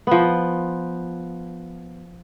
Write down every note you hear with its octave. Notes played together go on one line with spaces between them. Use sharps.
F3 B3